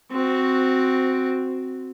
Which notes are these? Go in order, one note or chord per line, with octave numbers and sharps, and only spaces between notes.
C4 F#4